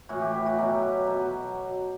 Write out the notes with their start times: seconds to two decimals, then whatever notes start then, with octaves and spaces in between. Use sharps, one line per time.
0.09 A2 E3 F#4
0.21 G4
0.34 G4
0.46 F#4
0.58 B2 F#3 G4
1.07 B2 F#3